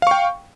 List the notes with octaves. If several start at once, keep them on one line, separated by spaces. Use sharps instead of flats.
F5 G5 C#6